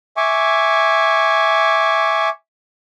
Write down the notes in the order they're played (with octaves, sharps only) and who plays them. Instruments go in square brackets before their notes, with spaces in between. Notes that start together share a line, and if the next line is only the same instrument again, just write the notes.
[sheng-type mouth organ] E5 G#5 C#6 D6